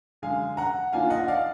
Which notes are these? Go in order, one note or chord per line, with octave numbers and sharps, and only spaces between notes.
F#2 D3 G#3 F5 G#5
F#5 A#5
D#3 A#3 D4 F4 F5 G#5
D#5 F#5
D5 F5